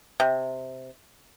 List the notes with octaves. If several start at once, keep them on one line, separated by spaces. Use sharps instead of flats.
C3